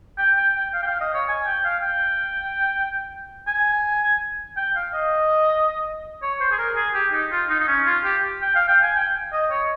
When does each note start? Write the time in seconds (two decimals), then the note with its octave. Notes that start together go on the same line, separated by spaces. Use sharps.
0.18 G5
0.37 G5
0.55 G5
0.73 F5
0.83 G5
0.87 F5
1.01 D#5
1.14 C#5
1.29 G#5
1.47 G5
1.65 F5
1.82 G5
3.47 G#5
4.57 G5
4.75 F5
4.94 D#5
6.22 C#5
6.41 C5
6.52 G#4
6.58 A#4
6.76 G#4
6.94 G4
7.13 D#4
7.32 F4
7.49 D#4
7.60 D#4
7.68 C#4
7.86 F4
8.05 G4
8.42 G5
8.55 F5
8.68 G5
8.82 G#5
8.96 G5
9.32 D#5
9.51 C#5